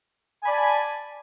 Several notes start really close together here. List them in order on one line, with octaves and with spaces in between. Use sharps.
G#5 B5 D5 A5